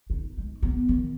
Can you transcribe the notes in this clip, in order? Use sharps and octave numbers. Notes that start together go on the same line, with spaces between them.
D#4
G#3
B3
D#3